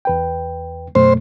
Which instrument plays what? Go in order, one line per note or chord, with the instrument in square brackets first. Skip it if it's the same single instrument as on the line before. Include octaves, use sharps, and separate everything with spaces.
[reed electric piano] E2 B4 G5
[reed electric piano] F#2 B2 A3 [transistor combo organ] C5